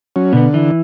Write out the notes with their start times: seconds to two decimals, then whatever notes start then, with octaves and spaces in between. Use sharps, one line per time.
0.16 F#3 C#4
0.33 B2 D3 B3
0.54 E3